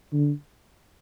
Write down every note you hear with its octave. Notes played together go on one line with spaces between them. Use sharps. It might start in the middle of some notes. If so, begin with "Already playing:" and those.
D3